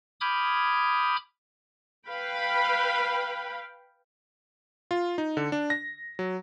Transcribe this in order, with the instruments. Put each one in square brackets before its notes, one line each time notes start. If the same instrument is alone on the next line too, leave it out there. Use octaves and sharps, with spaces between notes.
[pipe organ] B5 D6 D#6 F6 G6 G#6
[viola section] B4 F5 G5 B5
[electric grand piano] F4
D#4
D3
D4
A#6
F#3